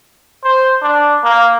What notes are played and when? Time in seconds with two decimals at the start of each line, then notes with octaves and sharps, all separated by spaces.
0.44 C5
0.82 D4
1.24 A#3